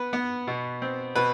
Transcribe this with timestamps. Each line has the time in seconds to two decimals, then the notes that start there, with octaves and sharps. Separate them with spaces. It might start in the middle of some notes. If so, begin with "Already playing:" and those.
Already playing: B3 B4
0.13 B3
0.47 B2
0.82 C4
1.15 B2 B4